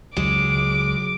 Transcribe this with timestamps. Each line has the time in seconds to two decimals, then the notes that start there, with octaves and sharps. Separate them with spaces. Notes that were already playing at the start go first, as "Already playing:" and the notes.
0.17 C#2 F#3 G#3 D6